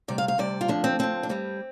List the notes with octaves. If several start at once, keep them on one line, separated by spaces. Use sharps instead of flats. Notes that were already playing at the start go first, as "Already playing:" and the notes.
D2 C3 G3 D5
F5
F5
D2 C3 G3 D5
F4
D2 D3 F3 D4
C4
D2 D3 F3 C4
D4
G2 G3 C4